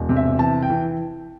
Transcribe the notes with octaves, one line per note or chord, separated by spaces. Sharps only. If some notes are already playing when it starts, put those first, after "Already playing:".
Already playing: E1
C3
E5
E3 A5
G5
E3